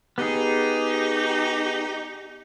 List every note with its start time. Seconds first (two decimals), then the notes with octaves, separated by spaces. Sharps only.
0.18 B3 D#4 G4 G#4